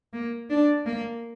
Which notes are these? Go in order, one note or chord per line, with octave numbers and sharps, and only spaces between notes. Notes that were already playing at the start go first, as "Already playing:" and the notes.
A#3
D4
A#3